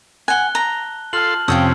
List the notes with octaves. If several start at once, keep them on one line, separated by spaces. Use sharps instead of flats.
F#5 G#5 F#6 G7
A5 A#5
F4 A4 A5 C6 F6 F#7
F2 C3 C#4 F5 G5 A5 D#6 E6